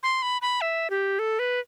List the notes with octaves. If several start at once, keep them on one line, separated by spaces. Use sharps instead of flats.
C6
B5
B5
E5
G4
A4
B4